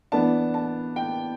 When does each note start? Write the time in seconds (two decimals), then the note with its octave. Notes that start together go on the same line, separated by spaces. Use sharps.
0.12 E3 B3 D4 A5
0.54 A5
0.96 G5